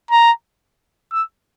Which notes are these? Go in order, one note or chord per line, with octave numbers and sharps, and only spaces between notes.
A#5
E6